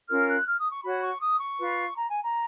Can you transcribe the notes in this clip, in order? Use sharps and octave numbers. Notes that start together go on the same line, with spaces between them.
C#4 F4 A#4 F6
F#6
F6
D#6
C#6
F#4 C#5 B5
C#6
D#6
C#6
F4 B4
A#5
G#5
A#5